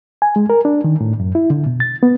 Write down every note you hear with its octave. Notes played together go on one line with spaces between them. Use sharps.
G#5
G#3
A#4
D4
D#3
A2
F#2
E4
D3
B2
A6
B3